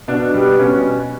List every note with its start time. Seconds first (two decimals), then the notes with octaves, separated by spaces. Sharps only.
0.08 B2 D4
0.34 G3 B3
0.59 B2 C#4